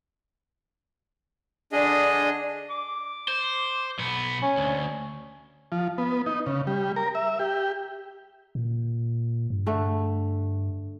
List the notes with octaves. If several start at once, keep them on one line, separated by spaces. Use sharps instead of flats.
D3 D4 G#4 D#5
D6
C5
B1 B3
C#4
D2
F3
B3
D#4
C#3
G3
A#4
E5
G4
A#2
G2
D3 A3